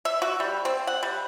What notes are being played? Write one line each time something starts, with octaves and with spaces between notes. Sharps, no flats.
E5
F#4
G3
C4
F#5
G3